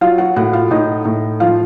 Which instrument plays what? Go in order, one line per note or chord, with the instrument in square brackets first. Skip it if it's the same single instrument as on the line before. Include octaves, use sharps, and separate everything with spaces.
[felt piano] F#3 F4 F5
F#4 F#5
A2 F#4 F#5
F4 F5
A2 D#4 D#5
A2
F3 F4 F5